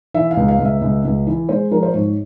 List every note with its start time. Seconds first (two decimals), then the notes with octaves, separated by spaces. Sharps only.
0.14 E3 E5
0.31 F5
0.37 C#2
0.48 F5
0.59 C#2
0.65 E5
0.81 C#2
1.05 C#2
1.27 E3
1.49 G#3 C5
1.71 F3 A#4
1.83 C5
1.93 G#2 C#5